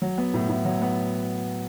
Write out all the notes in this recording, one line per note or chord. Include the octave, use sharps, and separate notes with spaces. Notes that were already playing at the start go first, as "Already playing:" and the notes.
F#3
B3
A2
A2
F#3
B3